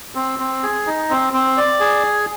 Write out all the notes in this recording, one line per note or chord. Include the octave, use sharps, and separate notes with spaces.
C4
C4
G#4
D#4
C4
C4
D5
G#4